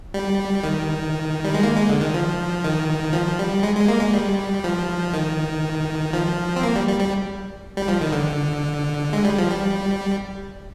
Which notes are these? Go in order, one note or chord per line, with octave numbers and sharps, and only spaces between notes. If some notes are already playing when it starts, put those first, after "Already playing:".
G3
D#3
G3
G#3
A#3
G#3
D3
D#3
F3
D#3
F3
G3
G#3
G#3
A#3
G#3
G3
F3
D#3
F3
C4
A#3
G3
G3
G3
G3
F3
D#3
D3
G#3
G3
F3
G3